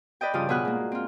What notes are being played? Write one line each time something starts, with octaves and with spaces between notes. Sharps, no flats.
B4 D5 D#5 G5
G2 C#3 F3 F4 D5 D#6
B2 F4 G#4 B4 F#5 F#6
G#2 A#3
C4 F4